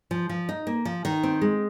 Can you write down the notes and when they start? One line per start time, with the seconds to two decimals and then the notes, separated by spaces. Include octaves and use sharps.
0.11 F3
0.29 F3
0.49 D#4
0.67 A#3
0.85 F3
1.05 D#3
1.23 C4
1.42 G#3